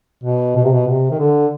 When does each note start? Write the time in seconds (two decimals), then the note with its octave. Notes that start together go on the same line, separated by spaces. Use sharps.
0.24 B2
0.56 B2
0.64 C3
0.72 B2
0.88 C3
1.11 D#3
1.19 D3